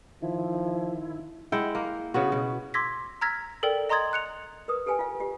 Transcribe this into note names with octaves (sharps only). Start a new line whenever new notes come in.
D#3 F3 E4
G#3 E4 F#5 G5
A#3
C#3 B3 F#4
B2
C6 D6 E6 G#6 A#6 B6
A#5 E6 F6 G#6 A#6 B6
A4 A#4 D5 G5
D#5 A#5 C6 D#6 G#6 A6
F#6 C#7 F7
A#4 B4 D#6
G4 A4 B4 G5 G#5
F4 F5
F4 G4